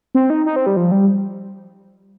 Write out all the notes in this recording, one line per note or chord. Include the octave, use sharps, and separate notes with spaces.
C4
D#4
D#4
C4
G3
F3
G3